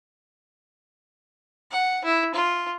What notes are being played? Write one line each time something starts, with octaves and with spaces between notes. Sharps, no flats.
F#5
E4
F4